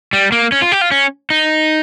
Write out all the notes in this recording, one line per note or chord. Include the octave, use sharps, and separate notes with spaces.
G3
A#3
C#4
F4
G4
F4
C#4
D#4